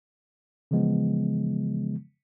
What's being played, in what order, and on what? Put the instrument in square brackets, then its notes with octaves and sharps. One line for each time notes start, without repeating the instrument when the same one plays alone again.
[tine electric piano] C#3 E3 F3 G#3 B3